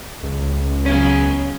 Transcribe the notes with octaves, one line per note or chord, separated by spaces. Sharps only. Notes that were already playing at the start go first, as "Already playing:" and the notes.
C#2
C#3 F#3 B3 C#4